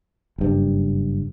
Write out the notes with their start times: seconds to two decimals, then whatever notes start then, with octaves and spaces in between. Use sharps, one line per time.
0.38 F#1 G2